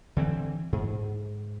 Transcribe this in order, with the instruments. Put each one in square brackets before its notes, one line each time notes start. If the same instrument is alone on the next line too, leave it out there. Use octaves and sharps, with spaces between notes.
[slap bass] D3 E3 C4
G#2